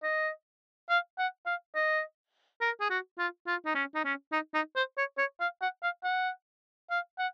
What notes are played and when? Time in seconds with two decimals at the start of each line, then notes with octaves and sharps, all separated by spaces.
0.03 D#5
0.90 F5
1.19 F#5
1.46 F5
1.75 D#5
2.61 A#4
2.81 G#4
2.90 F#4
3.19 F4
3.47 F4
3.66 D#4
3.75 C#4
3.95 D#4
4.05 C#4
4.32 D#4
4.54 D#4
4.76 C5
4.98 C#5
5.18 C#5
5.41 F5
5.62 F#5
5.83 F5
6.04 F#5
6.90 F5
7.19 F#5